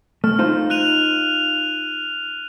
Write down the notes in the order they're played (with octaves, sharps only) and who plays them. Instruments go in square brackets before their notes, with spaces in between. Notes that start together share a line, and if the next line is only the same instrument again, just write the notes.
[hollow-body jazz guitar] A3 [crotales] F6
[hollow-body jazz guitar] D#4 F4 C5
[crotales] F#6 D#7 F7